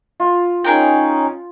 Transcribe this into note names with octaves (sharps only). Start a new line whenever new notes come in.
F4
C#4 D#4 G#4 A#4 G5